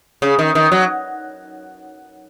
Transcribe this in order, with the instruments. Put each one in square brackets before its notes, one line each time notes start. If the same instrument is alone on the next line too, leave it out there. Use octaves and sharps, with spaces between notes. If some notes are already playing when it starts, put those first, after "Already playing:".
[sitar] C#3
D#3
D#3
F#3